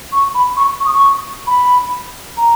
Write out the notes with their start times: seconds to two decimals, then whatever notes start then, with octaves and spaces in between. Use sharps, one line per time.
0.12 C#6
0.34 B5
0.56 C#6
0.80 C#6
0.86 D#6
0.91 C#6
1.47 B5
2.37 A#5